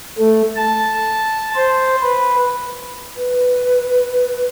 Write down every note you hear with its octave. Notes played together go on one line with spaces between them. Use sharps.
A3
A5
C5
B4
B4